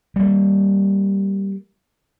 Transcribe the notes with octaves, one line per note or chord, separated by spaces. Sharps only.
G3 A#3